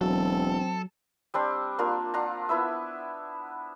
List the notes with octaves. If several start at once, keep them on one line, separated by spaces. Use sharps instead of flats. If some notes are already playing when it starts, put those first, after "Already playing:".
E1 F#3 C4 A4
G3 C4 D4
A#3 D4 F4 A#4
D4 F4 F#5 A#5
B3 E4 B4 E5